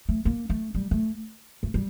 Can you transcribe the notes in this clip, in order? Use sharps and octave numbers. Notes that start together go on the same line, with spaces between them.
A3
A#3
A3
G3
A3
A3
G3